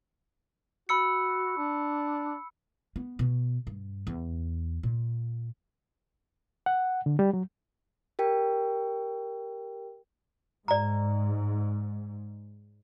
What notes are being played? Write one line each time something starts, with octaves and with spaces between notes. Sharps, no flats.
F#4 B5 E6 C#7
D4
B3
B2
G2
E2
A#2
F#5
D3
G3
F#3
G4 A#4 G5
G#2 D5 A#5